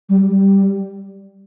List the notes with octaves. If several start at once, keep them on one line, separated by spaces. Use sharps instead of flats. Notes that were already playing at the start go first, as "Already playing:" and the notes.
G3
G3